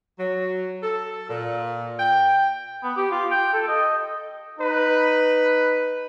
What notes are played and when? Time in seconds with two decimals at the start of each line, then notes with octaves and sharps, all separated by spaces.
0.19 F#3
0.83 A4
1.29 A#2
1.99 G5
2.84 B3
2.97 G4
3.11 F4
3.31 G5
3.53 A4
3.68 D#5
4.59 D#4 B4